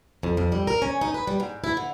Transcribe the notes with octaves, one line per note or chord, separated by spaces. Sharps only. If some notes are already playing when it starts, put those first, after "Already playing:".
F2
F2
G3
A#4
C#4
D#4
B4
G3
G#2
E4
D3